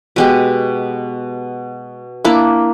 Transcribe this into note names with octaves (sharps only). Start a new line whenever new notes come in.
B2 G#3 G4
A#3 D4 E4